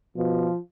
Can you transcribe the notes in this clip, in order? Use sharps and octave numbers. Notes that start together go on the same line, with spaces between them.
B2 F3